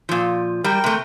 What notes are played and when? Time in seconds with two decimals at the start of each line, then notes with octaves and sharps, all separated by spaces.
0.09 A#2 F3
0.64 G3 A#4 G5
0.84 C3 A3